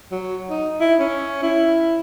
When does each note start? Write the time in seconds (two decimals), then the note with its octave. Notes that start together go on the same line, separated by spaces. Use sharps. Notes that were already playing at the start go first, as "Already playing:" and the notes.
0.11 F#3
0.50 D#4
0.81 E4
1.00 C#4
1.43 E4